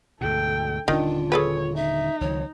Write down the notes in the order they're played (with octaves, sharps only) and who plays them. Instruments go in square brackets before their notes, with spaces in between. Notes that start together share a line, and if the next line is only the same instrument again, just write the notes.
[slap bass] D2 G#2 B2 [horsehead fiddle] A4 G5
[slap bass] D#1 D3 C#4 [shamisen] D#3 [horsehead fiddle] D4 [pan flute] F4
[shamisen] G#4 A4 B4 [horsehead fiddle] C#5
[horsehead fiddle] D#4 [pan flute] E5
[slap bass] C#2 D#3 F3 [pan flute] C#5